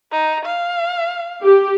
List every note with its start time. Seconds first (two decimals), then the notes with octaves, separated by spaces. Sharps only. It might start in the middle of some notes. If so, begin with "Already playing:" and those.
0.11 D#4
0.45 F5
1.44 G4